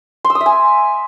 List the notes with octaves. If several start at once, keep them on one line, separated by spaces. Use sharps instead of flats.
C6
E6
D#6
E5
G#5